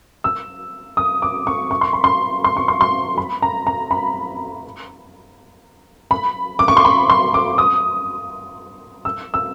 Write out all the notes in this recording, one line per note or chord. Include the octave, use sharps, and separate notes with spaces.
E6
D#6
D6
C#6
C#6
C6
B5
C6
C6
C#6
C6
C6
B5
A#5
A#5
B5
B5
D6
C#6
C6
B5
C6
D6
D#6
E6
E6